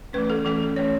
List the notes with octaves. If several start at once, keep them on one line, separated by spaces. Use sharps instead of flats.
E3 A3 C#4 B4
A4
E3 A3 C#4 A4
E3 A3 C#4 C#5